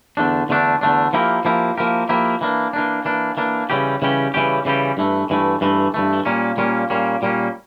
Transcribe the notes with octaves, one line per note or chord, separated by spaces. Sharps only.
E2 D3 A3 D4
E2 D3 A3 D4
E2 D3 A3 D4
F3 A#3 E4 G4 A#4
F3 A#3 E4 G4 A#4
F3 A#3 E4 G4 A#4
F3 A#3 E4 G4 A#4
E3 A#3 D4
E3 A#3 D4
E3 A#3 D4
E3 A#3 D4
C#3 E3 G3 C#4 G4
C#3 E3 G3 C#4 G4
C#3 E3 G3 C#4 G4
C#3 E3 G3 C#4 G4
G2 E3 A3
G2 E3 A3
G2 E3 A3
G2 E3 A3
A#2 G3 A#3 C#4
A#2 G3 A#3 C#4
A#2 G3 A#3 C#4
A#2 G3 A#3 C#4